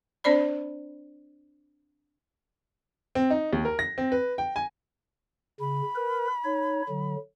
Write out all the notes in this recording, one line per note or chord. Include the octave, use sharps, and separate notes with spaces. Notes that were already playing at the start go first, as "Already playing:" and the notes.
C4 D4 C5 D5 B5
C4
D#4
D#2
A#4
A#6
C4
B4
G5
G#5
C#3 B5
A#4 B4
D#4 C#5
D3 F#3